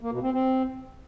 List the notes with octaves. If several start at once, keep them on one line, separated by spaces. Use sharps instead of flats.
A#3
B2
C4
C4